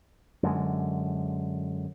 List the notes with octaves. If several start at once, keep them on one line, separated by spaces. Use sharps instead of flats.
F#2 D3 G#3